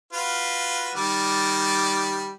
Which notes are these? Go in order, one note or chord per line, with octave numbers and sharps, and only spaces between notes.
F4 F#4 B4
D#3 G3 D5